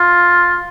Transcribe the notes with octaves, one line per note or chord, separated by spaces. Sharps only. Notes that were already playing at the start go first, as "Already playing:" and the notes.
Already playing: F4